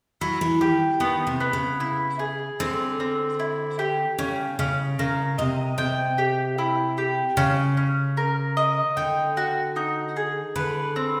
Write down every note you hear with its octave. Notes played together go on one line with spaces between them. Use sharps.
F#3 E4
E3
D#3 G4
D#3 B3
C3
B3
C#3
E4
G#4
D3 C4
C4
E4
G4
C#3 C#4
C#3 C#4
C#3 A#4
C3 D#5
C3 G5
G4
E4
G4
C#3 C#4
C#4
A#4
D#5
D3 G5
F#4
D#4
G#4
D3 B4
C4